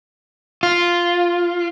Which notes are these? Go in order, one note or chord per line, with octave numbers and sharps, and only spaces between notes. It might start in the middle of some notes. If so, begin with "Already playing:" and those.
F4